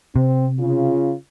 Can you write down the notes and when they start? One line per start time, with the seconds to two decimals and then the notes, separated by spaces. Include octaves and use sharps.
0.16 C3 C4
0.60 C#3 F4